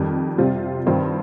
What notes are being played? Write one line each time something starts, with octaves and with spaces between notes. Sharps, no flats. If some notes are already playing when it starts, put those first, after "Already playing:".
Already playing: F2 D#3 G3
C3 G3 C4 F4
G2 D#3 C4 F4